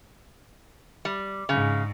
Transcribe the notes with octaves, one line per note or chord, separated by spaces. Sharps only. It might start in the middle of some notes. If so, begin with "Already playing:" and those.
G3
G#2 C#3